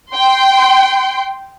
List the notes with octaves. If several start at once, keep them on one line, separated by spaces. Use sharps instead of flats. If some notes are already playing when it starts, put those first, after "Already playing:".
G5 C6